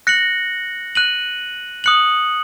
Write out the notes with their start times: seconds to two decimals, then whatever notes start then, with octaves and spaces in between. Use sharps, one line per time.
0.07 F#6 A#6 C#7 F#7
0.95 F#6 D#7 F#7
1.84 D#6 F#6 C#7 F#7